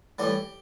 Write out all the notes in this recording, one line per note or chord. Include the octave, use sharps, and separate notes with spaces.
A2 E3 G3 G4